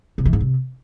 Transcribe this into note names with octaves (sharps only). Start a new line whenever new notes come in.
C3
E3
G#2
C3